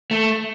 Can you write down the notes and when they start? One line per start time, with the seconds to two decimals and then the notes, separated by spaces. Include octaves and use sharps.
0.11 A3